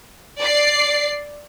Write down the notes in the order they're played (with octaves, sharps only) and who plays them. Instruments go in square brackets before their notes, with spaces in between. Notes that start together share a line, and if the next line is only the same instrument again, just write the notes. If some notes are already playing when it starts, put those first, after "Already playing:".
[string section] D5 C7